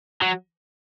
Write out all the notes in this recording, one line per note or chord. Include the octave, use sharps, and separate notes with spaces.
F#3